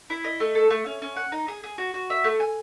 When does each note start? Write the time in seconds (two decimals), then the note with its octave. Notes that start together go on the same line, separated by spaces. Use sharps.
0.10 E4
0.24 D#5
0.40 A3
0.55 A4
0.70 A3
0.86 C#4
1.02 C#4
1.16 F#5
1.32 D#4
1.48 G#4
1.64 G#4
1.78 F#4
1.94 F#4
2.10 E5
2.24 A3
2.40 G#5